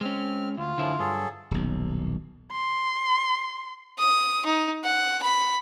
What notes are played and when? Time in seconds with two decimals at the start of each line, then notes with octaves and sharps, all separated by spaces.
0.01 G#3 C4 C#4 F6
0.57 D2 F4
0.78 F#2 A2 D3 F3 E4
0.99 G2 F#3 G#4 A4
1.51 D#1 B1
2.52 C6
3.99 D#6
4.46 D#4
4.84 F#5
5.22 B5